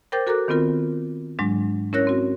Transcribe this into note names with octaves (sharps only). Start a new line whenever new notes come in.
A#4 C5 G5 D6 G6 A6
F#4 A4 A#4 A#5 D6 F#6
D#3 B3 C4 F4 A#4
G#2 F#3 G#3 D4
C#4 E4 A#4 C#5 F#6 A#6
C4 F#4